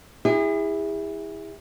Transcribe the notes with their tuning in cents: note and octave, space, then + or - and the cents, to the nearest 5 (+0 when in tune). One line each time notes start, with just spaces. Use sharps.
E4 -10 G#4 -40